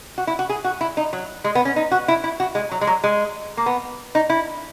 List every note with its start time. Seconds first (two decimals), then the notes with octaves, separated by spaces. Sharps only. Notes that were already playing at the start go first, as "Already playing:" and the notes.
0.18 F#4
0.27 E4
0.39 F#4
0.49 G#4
0.64 F#4
0.81 E4
0.97 D#4
1.13 F#3
1.44 G#3
1.55 B3
1.65 C#4
1.76 D#4
1.91 F#4
2.08 E4
2.24 E4
2.40 F#4
2.55 G#3
2.72 F#3
2.81 G#3
2.87 F#3
3.04 G#3
3.57 A#3
3.66 B3
4.15 D#4
4.30 E4